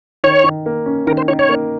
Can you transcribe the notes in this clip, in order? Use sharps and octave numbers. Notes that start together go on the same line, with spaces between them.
D#3 C#5
D#3
A#3
C#4
D#3 A#4
C5
D#3 C#5
C#5
A#3